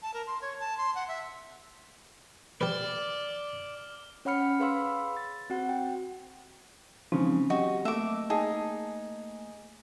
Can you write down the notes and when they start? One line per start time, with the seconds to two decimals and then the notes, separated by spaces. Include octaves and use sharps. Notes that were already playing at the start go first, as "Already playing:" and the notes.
0.02 A5
0.14 A#4
0.27 C6
0.42 C#5
0.60 A5
0.78 C6
0.95 F#5
1.08 E5
2.61 G4 B4 D5 D6 F6 G7
4.25 C#4 C#5 F#5 B5 F6 C#7
4.60 G#4 B4 F5 B5 C6 E6
5.17 A6
5.50 C4 F#4 F#5
5.69 G5
7.12 C#3 E3 F3 G#3 C4 D#4
7.50 F#3 F#4 G4 D#5
7.85 A3 A#3 E5 D6
8.30 D#4 G#4 A5